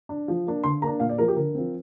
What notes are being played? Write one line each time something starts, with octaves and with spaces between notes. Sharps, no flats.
D4
F3
A#3 D4
D3 C6
A#3 D4 A#5
A#2 F5
D5
F3 A#3 A#4
G4
D3 A#4
F3 C4